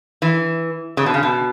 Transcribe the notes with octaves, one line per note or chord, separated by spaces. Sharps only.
E3
C#3
B2
C#3
B2